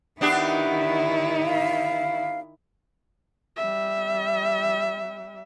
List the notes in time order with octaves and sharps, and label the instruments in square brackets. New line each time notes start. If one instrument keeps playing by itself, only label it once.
[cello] D#3 E4 [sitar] B3 D4 G4
[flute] F5
[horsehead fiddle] G3 E5